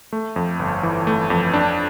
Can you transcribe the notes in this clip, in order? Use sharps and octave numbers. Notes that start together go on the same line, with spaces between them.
A3
F2
G1
E3
A3
F2
D4